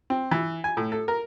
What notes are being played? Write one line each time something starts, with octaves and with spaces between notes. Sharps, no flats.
C4
E3
G#5
A2
A4
A#4